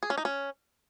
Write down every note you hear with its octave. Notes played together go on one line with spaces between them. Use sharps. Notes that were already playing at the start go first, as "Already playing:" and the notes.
G#4
C#4
D#4
C#4